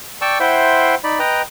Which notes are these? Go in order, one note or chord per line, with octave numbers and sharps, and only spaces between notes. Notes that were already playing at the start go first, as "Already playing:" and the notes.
D5 G5 A5 C#6 E6
E4 C5 E5 F#5 G5 C6
D#4 D5 B5
B4 D#5 G5 A#5